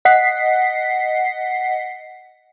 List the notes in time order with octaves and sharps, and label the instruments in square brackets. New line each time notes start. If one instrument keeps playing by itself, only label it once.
[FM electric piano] D#5 F#5 B6 C7